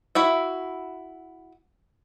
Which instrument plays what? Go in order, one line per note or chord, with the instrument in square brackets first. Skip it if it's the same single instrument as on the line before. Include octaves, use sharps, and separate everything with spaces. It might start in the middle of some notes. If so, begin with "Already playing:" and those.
[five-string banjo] E4 F#4 E5